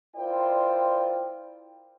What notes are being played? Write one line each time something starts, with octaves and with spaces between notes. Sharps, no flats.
E4 F4 A#4 C5 D5 G5